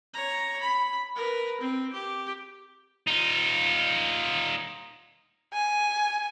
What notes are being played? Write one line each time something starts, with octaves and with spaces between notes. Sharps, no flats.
C#5 A#5
B5
A#4 B4
C4
G4
D#4 F4
G#5